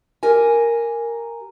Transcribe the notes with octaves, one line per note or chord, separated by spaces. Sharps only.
G4 A#4 G#5